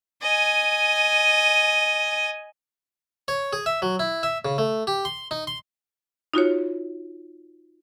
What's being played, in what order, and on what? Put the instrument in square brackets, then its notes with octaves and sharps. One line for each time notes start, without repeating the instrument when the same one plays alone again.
[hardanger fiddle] D#5 G#5
[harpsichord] C#5
G#4
E5
F#3
E4
E5
C#3
A3
G4
C6
D#4
C6
[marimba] D#4 F4 F#4 C#5